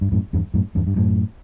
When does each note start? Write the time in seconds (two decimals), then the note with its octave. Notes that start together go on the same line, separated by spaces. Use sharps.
0.01 G2
0.12 F#2 A2
0.33 E2 G2
0.54 F#2 A2
0.75 E2 G2
0.87 G2
0.96 F#2 A2